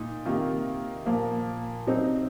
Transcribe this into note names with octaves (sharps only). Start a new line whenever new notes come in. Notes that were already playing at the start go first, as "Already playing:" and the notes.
Already playing: A#2 D#4
C3 D#3 A#3 F4
A#2 F3 A#3
C3 F#3 C4 D#4